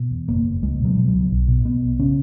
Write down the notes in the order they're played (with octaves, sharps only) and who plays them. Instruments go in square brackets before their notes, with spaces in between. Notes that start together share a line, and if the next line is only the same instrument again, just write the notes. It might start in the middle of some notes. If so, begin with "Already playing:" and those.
Already playing: [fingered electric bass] B2
E2
F#1 A#3
F#1
C#2 G#3
B2 F#3
B2
F#3
C#2
B1
B2
B2 B3
B1
C#3 C#4